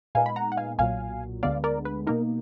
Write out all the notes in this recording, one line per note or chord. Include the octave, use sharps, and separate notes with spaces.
A#2 G#3 B3 D#4 F5 G#5
B5
F#5 A#5
F#5
F5 G#5
B1 A#2 F#3 F5 G#5
D2 D3 G#3 B3 D5 F5
A#4 D5
B4
B2 A#3 D#4 A#4